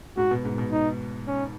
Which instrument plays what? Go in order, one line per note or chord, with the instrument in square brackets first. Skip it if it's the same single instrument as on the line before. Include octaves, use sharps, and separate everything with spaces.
[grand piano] G#2 [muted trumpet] F#4
[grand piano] B2
G#2
B2
[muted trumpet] D#4
C#4